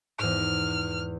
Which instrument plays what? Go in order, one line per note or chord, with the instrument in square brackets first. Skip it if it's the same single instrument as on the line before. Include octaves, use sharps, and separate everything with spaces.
[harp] E2 G#2 [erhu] F6